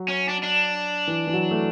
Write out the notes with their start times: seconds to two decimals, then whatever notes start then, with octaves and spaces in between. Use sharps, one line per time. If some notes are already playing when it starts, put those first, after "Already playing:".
Already playing: F#3
0.08 C#4
0.29 D4
0.43 D4
1.08 E3
1.27 E3
1.33 F#3
1.51 A3